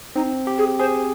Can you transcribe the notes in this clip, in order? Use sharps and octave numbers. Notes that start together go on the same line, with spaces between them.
C4 D#4
G4
G#4
G#4 C5